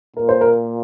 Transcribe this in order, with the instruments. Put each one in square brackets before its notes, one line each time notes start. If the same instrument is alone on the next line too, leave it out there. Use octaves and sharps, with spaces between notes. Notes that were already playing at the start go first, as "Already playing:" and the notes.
[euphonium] A#2 [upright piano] A#4
[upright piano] C5
A#4